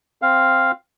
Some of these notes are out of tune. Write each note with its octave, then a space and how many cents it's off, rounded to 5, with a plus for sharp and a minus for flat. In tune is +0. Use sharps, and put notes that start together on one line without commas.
C4 +0 F5 +0